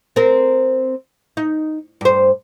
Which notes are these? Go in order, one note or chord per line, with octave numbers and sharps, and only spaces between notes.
C4 A#4
D#4
G2 C5